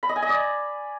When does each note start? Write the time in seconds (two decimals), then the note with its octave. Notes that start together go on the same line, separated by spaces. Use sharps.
0.03 B5
0.09 D#5
0.16 G#5
0.22 D#5
0.29 D5